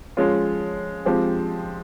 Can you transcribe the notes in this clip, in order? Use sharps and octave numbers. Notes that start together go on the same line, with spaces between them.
F3 G#3 C#4 F4
F3 G#3 C4 G4